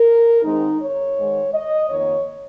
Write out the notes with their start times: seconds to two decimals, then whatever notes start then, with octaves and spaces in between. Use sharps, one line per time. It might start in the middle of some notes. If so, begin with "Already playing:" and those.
Already playing: A#4
0.42 G#2 D#3 G#3 C4 D#4
0.80 C#5
1.16 G#2 D#3 G#3
1.53 D#5
1.89 F2 D#3 A#3 C#5